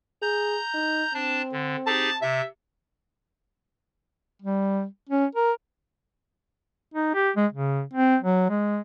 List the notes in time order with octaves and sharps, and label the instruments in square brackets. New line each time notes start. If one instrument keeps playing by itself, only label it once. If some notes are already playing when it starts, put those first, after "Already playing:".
[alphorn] G#4 [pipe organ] A#5 G6
[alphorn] D#4
[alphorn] C4 [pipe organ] D4 A5
[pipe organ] D3
[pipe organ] D#4 G4 G#4 [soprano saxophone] A5
[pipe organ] C3 [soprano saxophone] E5
[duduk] G3
C#4
A#4
D#4
G4
G#3
C#3
C4
F#3
G#3